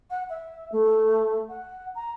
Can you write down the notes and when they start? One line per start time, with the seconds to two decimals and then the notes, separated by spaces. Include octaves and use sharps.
0.10 F#5
0.30 E5
0.72 A3
1.49 F#5
1.95 A#5